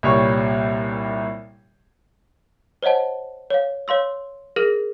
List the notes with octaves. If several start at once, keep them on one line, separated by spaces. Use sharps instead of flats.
C2 A#2 G3 C#5 C#6
C5 C#5 D#5 F#5 A5
C#5 F5
C#5 F5 C6 E6
G#4 A#4 F6 A#6 D#7 F#7